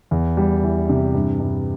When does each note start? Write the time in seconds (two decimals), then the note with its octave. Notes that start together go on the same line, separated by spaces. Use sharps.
0.11 E2
0.37 G3
0.63 E3
0.89 C3
1.14 G2
1.40 G2